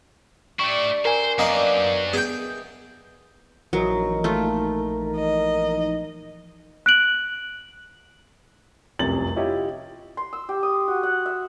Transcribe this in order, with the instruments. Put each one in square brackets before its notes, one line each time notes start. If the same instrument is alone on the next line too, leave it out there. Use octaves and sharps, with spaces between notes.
[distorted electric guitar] A3 E4 [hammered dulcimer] D4 G4 [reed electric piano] C#6
[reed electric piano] A#4 G#5 [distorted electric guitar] C5
[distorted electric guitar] F#2 F#3 [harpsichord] A#3 D#5 [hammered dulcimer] B3 D4
[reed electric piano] B3 [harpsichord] G#4 G5 [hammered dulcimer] D#5 E5
[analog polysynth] A#1 E3 D#4 [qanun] F#3 [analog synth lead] A#4
[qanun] A3 F4
[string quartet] D#5
[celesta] F#6 D7 F#7
[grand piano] F1 C2 F#2 C3 A6 F#7
E4 F4 G4 C#5 D#5 E5
[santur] C6
E6
G4
D#6
F#4
F#5
E5